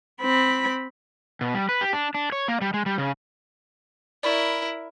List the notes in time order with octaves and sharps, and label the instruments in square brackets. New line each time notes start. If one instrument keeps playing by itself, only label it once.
[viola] C4 B5
[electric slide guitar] B2
G3
B4
G4
D4
D4
C#5
A#3
G3
G#3
G3
C#3
[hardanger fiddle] E4 A#4 [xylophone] D5 B5 C#6